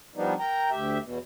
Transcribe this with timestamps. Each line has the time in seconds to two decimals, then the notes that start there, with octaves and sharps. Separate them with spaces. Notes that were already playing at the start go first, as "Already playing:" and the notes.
0.16 F3 G3 B3 D4 D#4
0.39 A#4 G5 A#5
0.71 D2 G4 E5
1.03 E2 B2